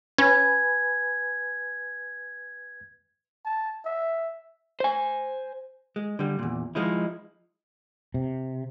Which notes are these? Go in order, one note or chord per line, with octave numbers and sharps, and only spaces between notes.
C#4 B4 G#5 G#6
A5
E5
C5 G#5
G#3
D3 G3
E2 A#2
F3 G#3 D#4 E4
C3